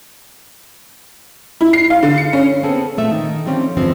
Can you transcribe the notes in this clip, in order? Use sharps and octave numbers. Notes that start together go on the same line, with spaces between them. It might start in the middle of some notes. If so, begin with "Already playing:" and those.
E4
C7
F5
D3
C#7
C#4
B3 C4 G#4 A4
A#2 A3 E5
D#3 D#4
F3 G3 A3 C4 C#4 G4
E2 G2 D3 F3 G#3 C4